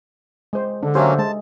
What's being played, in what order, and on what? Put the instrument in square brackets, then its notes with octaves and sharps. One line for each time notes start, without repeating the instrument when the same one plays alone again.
[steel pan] G#3 C5
[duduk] D3 [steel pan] D4
[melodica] F#3 A#3 C#4 [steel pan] G4 A4 E5 [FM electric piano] C5
[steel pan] G#3 [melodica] A5